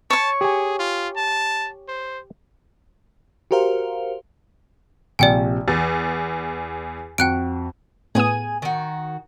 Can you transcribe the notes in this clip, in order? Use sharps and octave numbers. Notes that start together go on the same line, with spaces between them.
C#5 A5 C#6
G4 G#4 G#5
F4
A5
C5
F#4 G4 A#4 C5 F5
A#1 C3 F3 D5 G5 G#5
E2 A6
F2 F#4 G5 F#6 D7
A2 B3 G#4 G#5 D#6
D#3 F#4